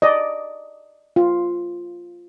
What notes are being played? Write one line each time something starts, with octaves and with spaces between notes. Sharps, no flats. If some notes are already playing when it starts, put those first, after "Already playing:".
D5 D#5
F4